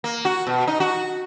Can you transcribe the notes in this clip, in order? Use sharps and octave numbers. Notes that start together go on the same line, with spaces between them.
A#3
F#4
B2
D#4
F#4